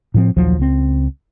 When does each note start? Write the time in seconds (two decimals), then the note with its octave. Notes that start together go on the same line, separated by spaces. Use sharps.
0.14 A2 F3 C4
0.36 A#1 D#2 F3 F#3
0.59 C#2 C4